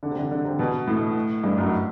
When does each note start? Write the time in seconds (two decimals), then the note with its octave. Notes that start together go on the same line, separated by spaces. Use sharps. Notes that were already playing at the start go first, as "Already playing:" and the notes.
0.03 D3
0.11 C3
0.19 D3
0.31 D3
0.45 C3
0.59 B2
0.88 A2
1.44 G2
1.58 F#2